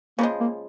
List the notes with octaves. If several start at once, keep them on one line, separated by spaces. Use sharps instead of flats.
C#3 F3 G#3 A#3
A#3